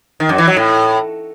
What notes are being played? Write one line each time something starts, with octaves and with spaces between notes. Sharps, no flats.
D#3
F#2
E3
F#3
A2